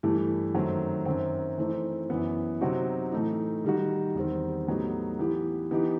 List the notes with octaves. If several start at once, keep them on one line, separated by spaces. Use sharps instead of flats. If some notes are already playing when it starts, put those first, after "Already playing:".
G2 E3 A3 E4 G4
F#2 D#3 F#3 A3 C4
F#2 D#3 F#3 C4
E3 A3 C4 D#4
F#2 E3 B3
C3 F#3 C4 D#4 F#4
A2 E3 A3 D#4
D#3 G3 D#4 F#4
E2 D#3 G3 C4
A2 F#3 B3 D#4 G4
E3 B3 E4 G4
E3 B3 D#4 G4